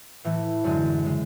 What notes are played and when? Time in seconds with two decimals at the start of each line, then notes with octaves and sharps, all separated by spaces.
0.24 A2 E3 A3
0.64 F#2 D3 G#3
1.04 C#3 G#3